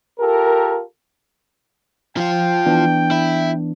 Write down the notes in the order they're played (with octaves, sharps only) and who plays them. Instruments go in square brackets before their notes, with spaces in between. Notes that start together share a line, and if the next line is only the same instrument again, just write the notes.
[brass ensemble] F4 G4 A4 A#4
[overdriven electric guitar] F3 F4 [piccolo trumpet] G5
[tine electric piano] E3 B3 D4
[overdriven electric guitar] E4